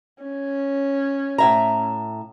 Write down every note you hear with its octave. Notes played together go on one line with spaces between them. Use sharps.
C#4
A2 E5 A#5